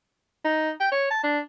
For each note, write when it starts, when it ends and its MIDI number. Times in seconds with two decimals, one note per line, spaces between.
0.44 0.71 63
0.80 0.90 79
0.91 1.10 73
1.10 1.18 81
1.23 1.39 62